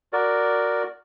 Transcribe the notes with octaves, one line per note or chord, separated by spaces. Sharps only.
F#4 A#4 D5